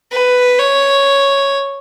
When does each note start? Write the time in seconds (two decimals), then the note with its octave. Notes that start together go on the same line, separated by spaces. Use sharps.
0.12 B4
0.59 C#5